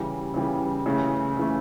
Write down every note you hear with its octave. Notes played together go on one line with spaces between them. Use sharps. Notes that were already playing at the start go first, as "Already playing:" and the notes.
Already playing: C#3 E3 G3
C#3 E3 G3
C#3 E3 A3
C#3 E3 A3